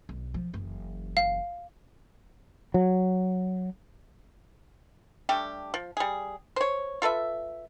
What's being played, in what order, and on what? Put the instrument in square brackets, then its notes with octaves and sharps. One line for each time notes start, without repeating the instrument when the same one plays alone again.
[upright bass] B1
F3
F#1 E3
[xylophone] F5
[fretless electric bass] F#3
[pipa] G3 A3 D4 G4
F3
G3 G#4
C5 C#5
F4 A4 B4 E5